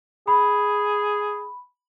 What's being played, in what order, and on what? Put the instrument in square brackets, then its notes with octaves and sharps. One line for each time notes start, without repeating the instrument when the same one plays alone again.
[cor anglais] G#4 [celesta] B5